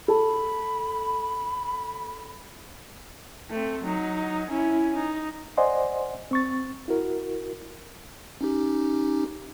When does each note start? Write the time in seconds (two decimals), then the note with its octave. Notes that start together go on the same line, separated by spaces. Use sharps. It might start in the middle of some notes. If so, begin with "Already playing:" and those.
0.08 A4 A5 B5
3.51 A3 C4
3.83 F#3 D#4
4.49 C#4 E4
4.95 D#4
5.57 C5 D5 D#5 F#5 G#5 C6
6.31 C4 C#6 A6
6.88 E4 F#4 A#4
8.41 C#4 D#4 G4